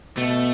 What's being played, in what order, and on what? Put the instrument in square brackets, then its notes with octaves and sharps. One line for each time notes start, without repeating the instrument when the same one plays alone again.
[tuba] B2 [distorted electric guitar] A3